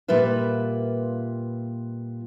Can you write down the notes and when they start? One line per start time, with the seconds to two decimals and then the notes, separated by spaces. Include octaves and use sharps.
0.08 A#2 G3 F4 A#4 B4 E5